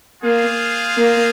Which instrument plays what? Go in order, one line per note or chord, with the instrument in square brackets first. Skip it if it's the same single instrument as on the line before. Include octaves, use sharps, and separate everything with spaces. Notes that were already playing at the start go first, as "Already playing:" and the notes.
[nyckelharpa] A#3 [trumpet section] F4 G#4 C5 F5
[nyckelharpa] A#3